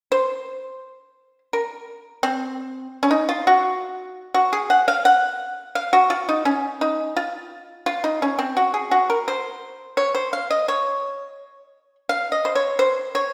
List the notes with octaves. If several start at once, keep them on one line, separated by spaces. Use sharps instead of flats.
C5
A#4
C4
C#4
D#4
F4
F#4
F#4
G#4
F#5
F5
F#5
F5
F#4
F4
D#4
C#4
D#4
F4
F4
D#4
C#4
C4
F#4
G#4
F#4
A#4
C5
C#5
C5
F5
D#5
C#5
F5
D#5
C5
C#5
C5
C#5